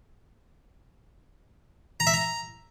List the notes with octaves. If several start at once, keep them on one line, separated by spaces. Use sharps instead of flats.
A#5
E5
A#5